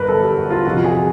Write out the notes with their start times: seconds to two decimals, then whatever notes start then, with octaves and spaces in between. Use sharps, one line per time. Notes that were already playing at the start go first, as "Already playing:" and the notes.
Already playing: G1 F#2 D3 A#4 B4
0.09 A4
0.23 G4
0.37 F#4
0.50 F4
0.65 F2 C3 F3 F#4
0.84 G#4